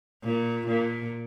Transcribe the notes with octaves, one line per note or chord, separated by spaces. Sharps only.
A#2
A#2